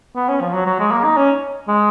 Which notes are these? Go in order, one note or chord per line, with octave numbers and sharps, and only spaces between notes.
B3
C#4
F3
F#3
F#3
G#3
A#3
D#4
C#4
G#3